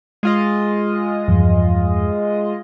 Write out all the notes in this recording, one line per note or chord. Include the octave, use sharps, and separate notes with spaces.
G#3 F4 D#5
E2 G2 F3